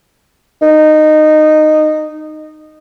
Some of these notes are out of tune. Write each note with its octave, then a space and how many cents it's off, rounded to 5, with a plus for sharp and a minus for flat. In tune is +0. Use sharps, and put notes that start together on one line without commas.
D#4 -15